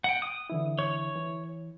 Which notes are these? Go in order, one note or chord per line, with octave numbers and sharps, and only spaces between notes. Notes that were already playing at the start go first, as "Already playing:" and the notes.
F#5 G5
D#6
D3 E3 E4
C#5
E3